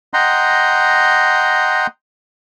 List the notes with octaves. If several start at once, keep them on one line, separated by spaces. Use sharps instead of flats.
D#5 F#5 G5 A#5 C6